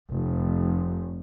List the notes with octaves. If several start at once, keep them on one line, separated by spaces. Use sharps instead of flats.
F1